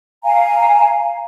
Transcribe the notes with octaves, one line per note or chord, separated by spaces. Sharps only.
F5 G#5 A#5